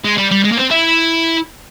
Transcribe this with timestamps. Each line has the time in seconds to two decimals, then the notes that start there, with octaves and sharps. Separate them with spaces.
0.04 G#3
0.18 G3
0.31 G3
0.44 G#3
0.52 A#3
0.57 C4
0.71 E4